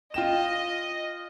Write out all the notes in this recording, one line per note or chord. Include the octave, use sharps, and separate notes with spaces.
F4 D#5 G5 E7